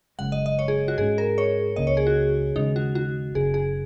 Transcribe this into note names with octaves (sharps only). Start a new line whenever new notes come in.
F#1 F#2 C#3 G#3 F#5
D#5
D#5
C#5
G#4
F#4
G#2 G#3 C#4 G#4
A#4
C#5
C#2 C#3 A#3 D#5
C#5
G#4
F#4
D#2 C#3 G#3 C#4 D#4
F#4
F#4
F#1 F#2 C#3 F#3 G#4
G#4